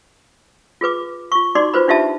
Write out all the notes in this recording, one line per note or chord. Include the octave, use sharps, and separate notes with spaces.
F4 G#4 B4 D6
F4 C#6
D#4 F#4 D5 C6 D6
F4 B4 C5 B5
D4 D#4 F4 G4 E5 A5